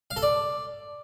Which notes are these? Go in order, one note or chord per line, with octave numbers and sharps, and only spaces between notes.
F5
A4
D5